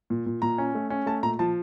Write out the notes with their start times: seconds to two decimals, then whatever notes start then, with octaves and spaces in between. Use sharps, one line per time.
0.10 A#2
0.26 A#2
0.42 A#2 A#5
0.58 C#4
0.75 A3
0.90 C#4
1.06 A3 A5
1.23 A#2 A#5
1.39 F3 A5